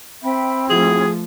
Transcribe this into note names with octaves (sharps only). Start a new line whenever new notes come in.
C4 E5 G5 B5
F3 A3 E4 F#4 G#4 G#6